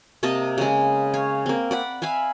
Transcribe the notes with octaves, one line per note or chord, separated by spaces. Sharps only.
C3 A#3 D#5 A5
C#3 G#3
C#5 F5
A#3 C4
D5 F#5 B5
E5 F5 G#5 B5